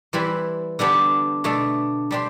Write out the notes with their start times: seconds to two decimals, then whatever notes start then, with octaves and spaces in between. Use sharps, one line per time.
0.13 E3 G3 C4 E4 B4
0.79 D3 G3 B3 D4 G4
1.44 B2 A3 D4 A4
2.11 G3 D4 G4 C5